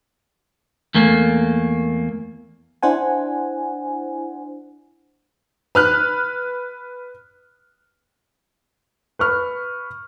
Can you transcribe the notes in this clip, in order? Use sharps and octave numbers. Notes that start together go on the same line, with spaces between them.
E2 A3 A#3
D4 E4 C5 F#5 G#5
B4 F6 F#6
B4 C#6 F6